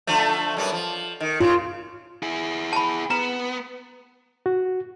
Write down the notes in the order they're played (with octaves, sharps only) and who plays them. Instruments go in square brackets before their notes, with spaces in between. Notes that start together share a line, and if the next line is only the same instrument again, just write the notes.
[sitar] D3 F3 A3
F#2 G3 B3
F3
D#3
[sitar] C#3 [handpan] F4
[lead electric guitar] E4 G#4
[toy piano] A5 B5
[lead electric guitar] B3 [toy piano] A#5
[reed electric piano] F#4